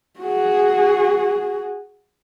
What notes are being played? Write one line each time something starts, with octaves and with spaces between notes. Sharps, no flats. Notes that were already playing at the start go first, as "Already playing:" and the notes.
F#4 G#4